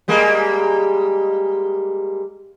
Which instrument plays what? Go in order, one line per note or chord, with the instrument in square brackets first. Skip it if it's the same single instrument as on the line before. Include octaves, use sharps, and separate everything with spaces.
[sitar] G3 G#3 A#3